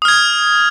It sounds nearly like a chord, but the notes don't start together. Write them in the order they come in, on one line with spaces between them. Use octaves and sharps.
D#6 F6 G#6